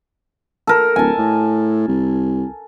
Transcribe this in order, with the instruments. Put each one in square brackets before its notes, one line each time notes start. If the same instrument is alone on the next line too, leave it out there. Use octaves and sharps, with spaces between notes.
[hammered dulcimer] A4 A#4
[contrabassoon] D1 [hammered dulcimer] G#5 A5
[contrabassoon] A2
C2